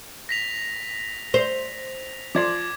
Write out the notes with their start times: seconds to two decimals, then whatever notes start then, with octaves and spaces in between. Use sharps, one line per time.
0.29 A#6 B6 F7
1.34 C5 F7
2.35 F3 D5 C6 D6 G#6